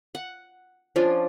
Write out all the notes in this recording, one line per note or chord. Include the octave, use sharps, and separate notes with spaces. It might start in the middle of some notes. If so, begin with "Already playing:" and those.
F#5
F3 C#4 D4 F4